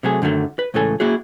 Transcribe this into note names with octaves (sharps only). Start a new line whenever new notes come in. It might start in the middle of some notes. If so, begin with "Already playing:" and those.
C3 F#3 A3 G#4
F#2 D3 D#3 F#3 A3
B4
C#2 A2 C#3 E3 A4 G#5
A#3 E4 F#4 G#4